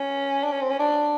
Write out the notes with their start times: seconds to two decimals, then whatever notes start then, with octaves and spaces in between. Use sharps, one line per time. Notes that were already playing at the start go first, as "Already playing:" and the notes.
Already playing: C#4
0.44 D4
0.52 C#4
0.61 C4
0.71 C#4
0.79 D4